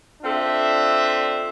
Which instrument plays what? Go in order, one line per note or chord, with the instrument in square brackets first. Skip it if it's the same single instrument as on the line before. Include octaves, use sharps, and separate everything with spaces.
[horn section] C4 D4 F4 A4 E5